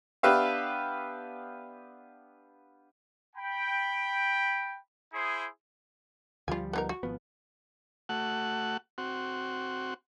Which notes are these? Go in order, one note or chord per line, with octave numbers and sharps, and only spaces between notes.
B3 D4 G4 B4 E5 F5
G5 B5
E4 G#4 C5 D#6
D2 F3 G3 F4 G#5
B3 D#4 A#4
F#4
G#1 F3 B3
A3 F#4 F#5
C4 F#4